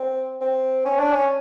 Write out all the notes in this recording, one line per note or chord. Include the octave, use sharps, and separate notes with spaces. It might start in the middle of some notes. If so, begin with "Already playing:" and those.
Already playing: C4
C4
C#4
D4
C#4